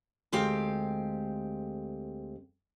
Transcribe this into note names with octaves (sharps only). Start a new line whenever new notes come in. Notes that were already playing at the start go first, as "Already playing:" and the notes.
D2 G#3 C4 G4 F5